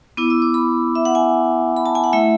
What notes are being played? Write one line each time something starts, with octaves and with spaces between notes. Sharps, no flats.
B3 E4 D6
E6
D6
B5
E5
F#5
G#5
B5
A5
G#5
F#5
A3 E4 E5